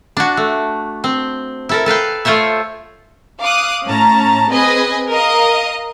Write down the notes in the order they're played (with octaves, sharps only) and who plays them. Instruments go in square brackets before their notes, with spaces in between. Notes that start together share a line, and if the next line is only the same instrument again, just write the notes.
[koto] D4 F#4
A3
C4
E4 A4 A#4
A4 B4 F5 G5
A3 F4 C5 C#5 E5
[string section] F5 D6 D#6 F#6
A2 C#4 A5 A#5
C4 G#4 B4 D#5 G#5
A#4 D#5 F5 A#5 D#6